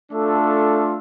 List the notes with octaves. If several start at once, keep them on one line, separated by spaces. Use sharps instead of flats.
A3 D4 F4 A4